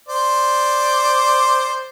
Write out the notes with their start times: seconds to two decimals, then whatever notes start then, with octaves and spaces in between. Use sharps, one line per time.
0.09 C5 D5